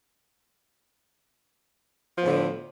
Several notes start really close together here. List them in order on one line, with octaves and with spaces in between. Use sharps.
F3 B3 A2 D3